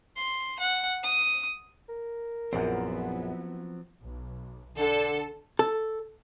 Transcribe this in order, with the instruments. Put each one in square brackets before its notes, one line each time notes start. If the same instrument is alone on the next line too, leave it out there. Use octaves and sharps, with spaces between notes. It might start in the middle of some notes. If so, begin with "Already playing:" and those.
[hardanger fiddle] C6
F#5
D#6
[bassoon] A#4
[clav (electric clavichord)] A#1 F#2 [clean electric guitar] F3 F#3 C4 [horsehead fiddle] B3 E4
[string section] B1
[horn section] D3 [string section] A4
[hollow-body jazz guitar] A4